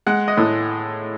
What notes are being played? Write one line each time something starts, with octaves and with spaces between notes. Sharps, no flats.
G#3 F#5
D#5
A2